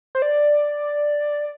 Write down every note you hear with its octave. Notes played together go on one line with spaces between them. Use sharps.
C5
D5